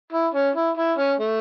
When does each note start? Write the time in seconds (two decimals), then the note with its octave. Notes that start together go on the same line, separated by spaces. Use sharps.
0.12 E4
0.34 C#4
0.55 E4
0.77 E4
0.98 C#4
1.20 A3